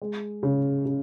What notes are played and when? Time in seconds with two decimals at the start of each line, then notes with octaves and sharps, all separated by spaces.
0.02 G#3
0.43 C#3
0.86 C#3